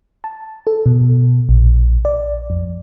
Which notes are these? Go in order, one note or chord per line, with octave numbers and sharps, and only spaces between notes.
A5
A4
B2
A#1
D5
F2